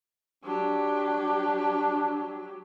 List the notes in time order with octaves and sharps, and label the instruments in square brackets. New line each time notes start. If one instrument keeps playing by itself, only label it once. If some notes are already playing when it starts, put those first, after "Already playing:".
[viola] F#3 G4 [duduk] D4